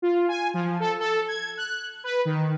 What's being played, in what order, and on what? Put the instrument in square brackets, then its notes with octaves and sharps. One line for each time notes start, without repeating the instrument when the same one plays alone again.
[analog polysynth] F4
G#5
F3
A4
A4
G#6
F#6
B4
D#3